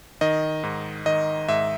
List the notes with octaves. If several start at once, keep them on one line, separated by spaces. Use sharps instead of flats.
D#3 D#5
G#2
D#3 D#5
G#2 E5